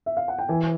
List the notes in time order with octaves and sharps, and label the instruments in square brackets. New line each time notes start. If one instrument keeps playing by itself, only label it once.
[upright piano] E5
F5
F#5
G5
[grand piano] E3 [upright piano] G#5